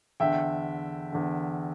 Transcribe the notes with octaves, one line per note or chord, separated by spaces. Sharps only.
E2 D3 E5 G5
E2 D3